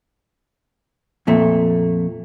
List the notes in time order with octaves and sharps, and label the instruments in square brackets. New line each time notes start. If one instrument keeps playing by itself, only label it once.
[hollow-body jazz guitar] F2 A#2 A3